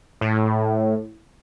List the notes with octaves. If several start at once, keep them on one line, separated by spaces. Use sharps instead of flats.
A2